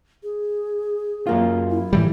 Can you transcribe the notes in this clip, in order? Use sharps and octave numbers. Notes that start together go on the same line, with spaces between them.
G#4
F#2 A#3 F4
E4
A2 E3 G3